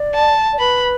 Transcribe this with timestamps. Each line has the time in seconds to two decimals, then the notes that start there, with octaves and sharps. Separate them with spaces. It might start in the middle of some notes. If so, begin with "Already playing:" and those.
Already playing: D5
0.14 A5
0.53 D5
0.59 B4 B5